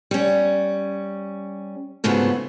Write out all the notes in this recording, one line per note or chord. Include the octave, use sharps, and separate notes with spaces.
G3 C#4
F2 G#2 C#3 F#3 A3 B3